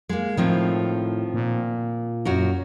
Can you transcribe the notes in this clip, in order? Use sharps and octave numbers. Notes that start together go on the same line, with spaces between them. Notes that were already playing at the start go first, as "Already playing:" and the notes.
G#3 A#3
A2 D#3 F3 C4
A#2
F#2 F#4 A#4